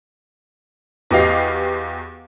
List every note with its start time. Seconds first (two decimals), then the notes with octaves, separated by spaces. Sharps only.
1.11 E2 B3 F#4 G4 D#5 F5